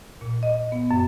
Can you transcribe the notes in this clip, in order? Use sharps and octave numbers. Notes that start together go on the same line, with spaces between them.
A#2
D#5
B3
F#2